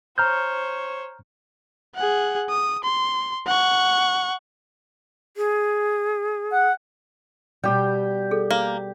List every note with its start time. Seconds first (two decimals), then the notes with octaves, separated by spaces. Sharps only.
0.18 C5 C#5 A#5 F6 G6
1.96 G#4 F#5
2.49 D#6
2.84 C6
3.46 F#5 C#6
5.37 G#4
6.52 F#5
7.64 B2 G3 G4 G5
8.31 G#4 A4
8.51 A#3